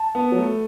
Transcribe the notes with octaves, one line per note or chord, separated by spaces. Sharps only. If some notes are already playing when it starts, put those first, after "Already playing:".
Already playing: A5
B3
F#3
A3